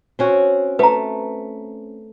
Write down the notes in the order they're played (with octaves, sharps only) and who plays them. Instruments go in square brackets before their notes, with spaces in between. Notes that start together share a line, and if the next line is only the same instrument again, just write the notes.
[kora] C4 C#4 F#4
[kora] A3 [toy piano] B4 A#5